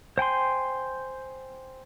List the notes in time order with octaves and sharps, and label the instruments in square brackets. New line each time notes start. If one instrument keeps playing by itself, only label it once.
[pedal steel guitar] C5 G5 G#5 C6